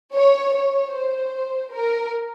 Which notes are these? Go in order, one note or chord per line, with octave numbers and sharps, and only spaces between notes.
C#5
C#5
C5
A#4